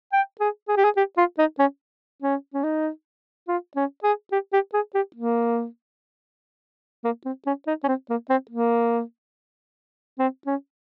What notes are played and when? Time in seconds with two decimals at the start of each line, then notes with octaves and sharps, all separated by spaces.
0.13 G5
0.40 G#4
0.69 G#4
0.77 G4
0.84 G#4
0.97 G4
1.18 F4
1.39 D#4
1.59 C#4
2.22 C#4
2.54 C#4
2.64 D#4
3.48 F4
3.76 C#4
4.04 G#4
4.32 G4
4.53 G4
4.74 G#4
4.95 G4
5.16 A#3
7.04 A#3
7.25 C4
7.46 C#4
7.67 D#4
7.84 C#4
7.88 C4
8.10 A#3
8.30 C4
8.51 A#3
10.19 C4
10.47 C#4